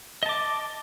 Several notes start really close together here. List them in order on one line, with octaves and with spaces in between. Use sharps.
D#5 A5 D6